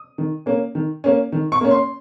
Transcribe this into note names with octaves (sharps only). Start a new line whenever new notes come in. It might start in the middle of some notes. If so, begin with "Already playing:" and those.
Already playing: D#6
D#3
A#3 C#4
D#3
A#3 C#4
D#3
C#6
A#3 C#4
C6